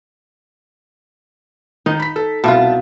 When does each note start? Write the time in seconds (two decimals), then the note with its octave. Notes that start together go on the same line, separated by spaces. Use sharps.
1.86 D#3 D#4
2.00 B5 B6
2.16 A4
2.44 C2 B2 F4 E5 A5